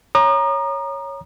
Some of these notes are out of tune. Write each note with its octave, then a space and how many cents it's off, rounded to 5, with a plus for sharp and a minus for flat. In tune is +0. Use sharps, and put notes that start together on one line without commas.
C#5 +0 A#5 +15 D#6 -40